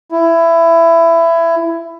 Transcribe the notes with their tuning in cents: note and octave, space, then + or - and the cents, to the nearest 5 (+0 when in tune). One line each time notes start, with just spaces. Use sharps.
E4 +15